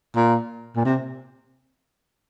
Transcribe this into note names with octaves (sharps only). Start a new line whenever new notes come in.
A#2
A#2
C3